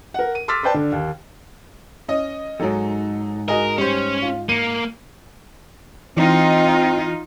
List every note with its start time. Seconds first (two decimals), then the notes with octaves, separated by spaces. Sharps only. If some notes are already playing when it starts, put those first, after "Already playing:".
0.14 A#4 F#5
0.35 D#7
0.48 C6 D6 E6 F6 A6 B6
0.63 B4 C5 D5 G5 A5
0.74 D3
0.92 D#2
2.08 C#4 D#5
2.60 F2 G#2 F#3 D#4 A4
3.48 F#4 G#4 A#4 D#5
3.78 G3 C#4 C5
4.22 F4
4.49 A#3 C#7 D#7
6.17 E3 C4 D#4 F4